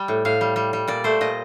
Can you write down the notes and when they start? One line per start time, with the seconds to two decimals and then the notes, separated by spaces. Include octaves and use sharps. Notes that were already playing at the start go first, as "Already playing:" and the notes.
Already playing: G3 G5
0.08 A2
0.25 A2 F5
0.41 G3
0.56 G3
0.73 G3
0.88 A#2 D5
1.04 A3 C5
1.21 A#2 D#5